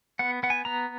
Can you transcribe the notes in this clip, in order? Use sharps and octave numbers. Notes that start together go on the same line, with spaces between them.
B3 F#5
B3 F#5
G#5
B3 A#5